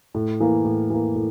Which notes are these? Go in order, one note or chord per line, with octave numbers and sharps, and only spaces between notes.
A2
E3 A#3
A2
E3 A#3
A2